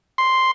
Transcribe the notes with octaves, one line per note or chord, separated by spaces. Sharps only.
C6